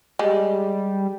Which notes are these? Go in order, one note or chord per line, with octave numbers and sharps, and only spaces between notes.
G3 G#3